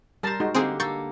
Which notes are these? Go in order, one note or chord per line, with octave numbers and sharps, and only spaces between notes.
G3 A#4 C5 A5 A#5
G#3 D#4 F#4
D3 A#3 C4 G4 G#4
A#3 A4 C#6 G6 A6